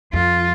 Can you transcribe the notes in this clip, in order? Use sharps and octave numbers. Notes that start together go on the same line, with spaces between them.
F2 F4